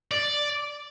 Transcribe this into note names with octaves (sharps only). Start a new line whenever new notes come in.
D5